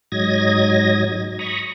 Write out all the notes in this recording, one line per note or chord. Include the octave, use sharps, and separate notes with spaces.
G#2 F#3 D#5 G#6 A#6
A#5 B5 C#6 D#6